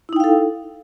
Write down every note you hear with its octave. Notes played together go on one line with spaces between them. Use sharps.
D#4 E4 A4 F5 G5